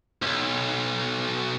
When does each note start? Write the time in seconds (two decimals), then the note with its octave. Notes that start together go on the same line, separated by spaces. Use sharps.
0.22 B1 F2